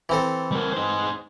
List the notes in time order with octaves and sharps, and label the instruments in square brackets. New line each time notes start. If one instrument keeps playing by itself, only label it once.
[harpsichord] E3 C4 A4
[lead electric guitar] G3 A#4
D#4 C5